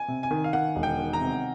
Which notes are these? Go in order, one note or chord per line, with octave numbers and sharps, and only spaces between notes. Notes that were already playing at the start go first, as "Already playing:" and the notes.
Already playing: G#5
C3
G#5
D#3
F5
D#3 F#5
E1
G5
D#3
A#5
C3